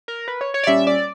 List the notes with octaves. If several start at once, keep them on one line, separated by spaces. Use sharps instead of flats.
A#4
B4
C#5
C#5
D5
A#2 G3 C#4 E5
D5